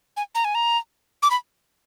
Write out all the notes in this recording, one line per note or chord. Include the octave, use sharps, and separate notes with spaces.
G#5
A#5
G#5
A#5
D6
B5